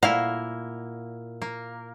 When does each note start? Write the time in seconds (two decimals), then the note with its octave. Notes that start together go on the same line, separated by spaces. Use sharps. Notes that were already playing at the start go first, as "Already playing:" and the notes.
0.03 A#2 A#3 E4 F5
1.42 A#3